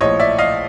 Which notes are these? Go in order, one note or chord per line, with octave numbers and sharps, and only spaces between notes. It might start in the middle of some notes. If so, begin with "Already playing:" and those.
A#1 A2 F3 C#5 D#5
D5 E5
D#5 F5